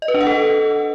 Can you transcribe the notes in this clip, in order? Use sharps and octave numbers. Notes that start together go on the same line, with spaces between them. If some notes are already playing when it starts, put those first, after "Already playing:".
D#5
B4
D4
F#5
A4